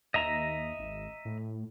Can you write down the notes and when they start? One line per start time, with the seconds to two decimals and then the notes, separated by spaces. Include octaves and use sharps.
0.14 D#2 D#5 E5 A#5
0.79 G#1
1.25 A2